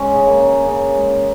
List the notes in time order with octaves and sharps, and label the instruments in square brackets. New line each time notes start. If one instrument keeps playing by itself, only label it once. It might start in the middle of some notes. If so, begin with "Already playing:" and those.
Already playing: [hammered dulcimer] G#3 C#4
C#3
A#3
C#3
C#3
G#3